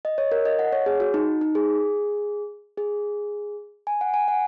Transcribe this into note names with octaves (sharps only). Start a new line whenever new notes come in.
D#5
C#5
A#4
D#5
F#5
C#5
G#4
F#4
D#4
D#4
G#4
G#4
G#5
F#5
G#5
F#5